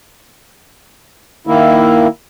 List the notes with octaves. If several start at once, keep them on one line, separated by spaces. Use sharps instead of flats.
D#3 A#3 E4